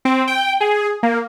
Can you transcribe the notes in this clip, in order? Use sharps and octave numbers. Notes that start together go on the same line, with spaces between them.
C4
G5
G#4
A#3